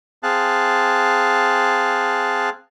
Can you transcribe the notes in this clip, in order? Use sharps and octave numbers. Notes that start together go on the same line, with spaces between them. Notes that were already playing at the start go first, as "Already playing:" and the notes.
C4 G#4 F5 A5 F#6